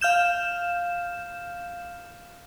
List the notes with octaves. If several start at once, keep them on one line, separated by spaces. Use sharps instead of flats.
F5 F6 G6 E7